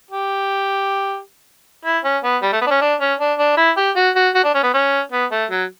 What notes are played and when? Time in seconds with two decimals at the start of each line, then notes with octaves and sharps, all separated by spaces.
0.11 G4
1.85 E4
2.04 C#4
2.24 B3
2.42 G3
2.52 A3
2.61 B3
2.67 D4
2.70 C#4
2.81 D4
3.00 C#4
3.20 D4
3.39 D4
3.57 E4
3.77 G4
3.96 F#4
4.16 F#4
4.35 F#4
4.44 D4
4.54 C#4
4.63 B3
4.74 C#4
5.12 B3
5.31 A3
5.50 F#3